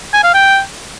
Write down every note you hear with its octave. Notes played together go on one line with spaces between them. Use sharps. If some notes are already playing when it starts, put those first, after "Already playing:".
G#5
F5
G5